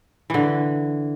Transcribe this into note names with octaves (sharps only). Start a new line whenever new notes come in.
D3 E3